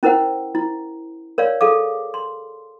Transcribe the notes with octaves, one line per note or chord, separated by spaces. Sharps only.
C#4 E4 A#4 C5 F#5
E4
A#4 C#5 D5 F5
G#4 A4 F5 D6
C6